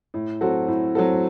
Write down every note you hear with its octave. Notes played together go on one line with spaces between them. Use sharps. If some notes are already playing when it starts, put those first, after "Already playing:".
A2
F#3 C4 F#4 A4
A2
F#3 C4 F#4 A4